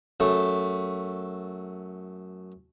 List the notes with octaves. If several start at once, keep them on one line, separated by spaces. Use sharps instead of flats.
F#2 A3